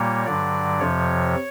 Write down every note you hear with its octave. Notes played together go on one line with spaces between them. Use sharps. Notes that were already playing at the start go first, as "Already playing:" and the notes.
Already playing: A#2 G3 A#3 C#5
G2 D3 F#3 D5
F2 C3 F3 C#5